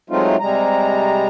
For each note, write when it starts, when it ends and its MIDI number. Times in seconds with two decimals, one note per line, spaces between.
0.10 0.36 54
0.10 0.36 56
0.10 0.36 57
0.10 0.36 60
0.10 0.36 63
0.10 0.36 65
0.40 1.28 48
0.40 1.28 55
0.40 1.28 56
0.40 1.28 82